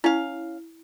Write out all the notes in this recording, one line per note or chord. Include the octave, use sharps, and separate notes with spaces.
C#4 E4 F5